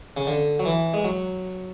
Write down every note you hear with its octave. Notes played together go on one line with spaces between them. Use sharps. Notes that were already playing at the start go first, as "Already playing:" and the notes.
C#3
D3
F#3
E3
G#3
F#3